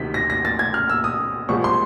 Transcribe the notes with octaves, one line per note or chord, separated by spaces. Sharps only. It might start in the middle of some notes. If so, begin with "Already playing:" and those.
Already playing: D2 C3 D#3 B6
A#6
A#6
A6
G#6
F6
E6
D#6
C2 A#2 F3 G#3 C4 C#6
C6